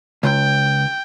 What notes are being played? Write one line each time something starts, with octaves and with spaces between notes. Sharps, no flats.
C#2 G5